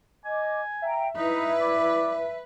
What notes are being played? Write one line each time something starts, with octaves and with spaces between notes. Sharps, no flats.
D#5 G#5 D6
E5 F5 G5 A#5
D#4 E4 B4
D5